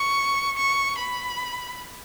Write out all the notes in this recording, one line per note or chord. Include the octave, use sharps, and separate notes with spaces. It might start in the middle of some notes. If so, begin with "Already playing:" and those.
Already playing: C#6
C#6
B5